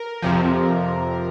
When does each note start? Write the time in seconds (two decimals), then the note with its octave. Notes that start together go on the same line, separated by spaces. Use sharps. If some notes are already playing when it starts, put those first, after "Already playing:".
Already playing: A#4
0.22 F2 C3 F3